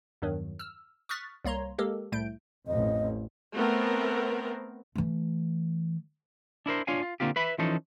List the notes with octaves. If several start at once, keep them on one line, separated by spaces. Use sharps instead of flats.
E2 G2 D#3 F#3
E6 F6
C#6 D#6 F6 F#6 A6 B6
C2 A#3 C#5 A#5 C6
G#3 A#3 G4 A4 A#4
C2 A2 A3 G6 D7
A1 F2 D#5
A3 B3 C4 A#4
E3 A3
D4 E4 A#4 C5
D4 F4 C#5 F5 G#5
F4
D3 A#3 C4 F4 G4
B4 E5 B5
E3 F3 C#4 D#4 A4